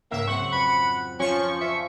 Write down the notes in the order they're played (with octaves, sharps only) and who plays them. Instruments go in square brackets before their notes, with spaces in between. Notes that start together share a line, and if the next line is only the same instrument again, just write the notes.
[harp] C#2 G#2 [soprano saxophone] A#3 [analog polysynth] E5
[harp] F#3 C4 [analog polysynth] F#5 [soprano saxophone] C#6
[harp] F2 [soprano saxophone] B5
[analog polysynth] F3 C#6 [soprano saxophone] C#4
[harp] C5 D5 G#5 [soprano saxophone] E5